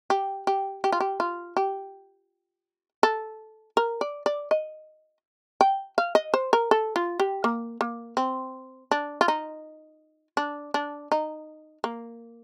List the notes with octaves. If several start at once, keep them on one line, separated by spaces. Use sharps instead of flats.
G4
G4
G4
F4
G4
F4
G4
A4
A#4
D5
D5
D#5
G5
F5
D#5
C5
A#4
A4
F4
G4
A#3
A#3
C4
D4
F4
D#4
D4
D4
D#4
A#3